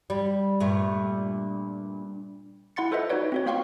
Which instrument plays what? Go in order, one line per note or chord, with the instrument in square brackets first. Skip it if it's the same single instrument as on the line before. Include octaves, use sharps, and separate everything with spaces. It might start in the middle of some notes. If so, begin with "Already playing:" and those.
[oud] G3
G2 A#2 A3
[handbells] E4 F#5 C6 A6 C#7
F4 A4 B4 C5 D#5 E5
D#4 F4 F#4 B4 C#5 D5
C4 F#4 C#5
A#3 F4 F5 G5 C6 C#6